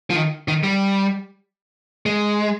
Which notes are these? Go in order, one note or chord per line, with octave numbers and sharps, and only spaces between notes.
F3
D#3
D#3
G3
G#3